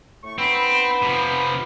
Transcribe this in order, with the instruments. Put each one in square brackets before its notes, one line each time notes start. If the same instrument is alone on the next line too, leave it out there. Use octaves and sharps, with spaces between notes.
[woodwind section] A2 A3 C#6
[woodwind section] B3 D#4 B5 [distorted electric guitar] C4
[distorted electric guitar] C3 F3